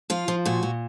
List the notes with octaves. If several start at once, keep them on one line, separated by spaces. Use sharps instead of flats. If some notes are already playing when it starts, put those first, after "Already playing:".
F3 F4
F3
A#2 F#4
A#2